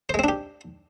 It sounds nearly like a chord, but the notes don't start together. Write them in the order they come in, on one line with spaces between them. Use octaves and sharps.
C5 G#3 C4 D4 G4